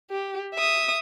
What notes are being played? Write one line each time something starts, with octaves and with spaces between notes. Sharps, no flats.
G4
E5 D#6